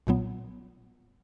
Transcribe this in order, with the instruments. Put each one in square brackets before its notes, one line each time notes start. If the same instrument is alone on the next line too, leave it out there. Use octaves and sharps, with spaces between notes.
[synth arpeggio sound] B1 A#2 F#3 B3